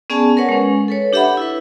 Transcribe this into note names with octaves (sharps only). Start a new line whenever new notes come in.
B3 C#4 G#4 D5 G#5 A5
C#4 A#4 B4 C#5 F#5
G#3 C#4
A4 B4 C#5
D4 G4 A4 E5 F#5 B5
E4 B4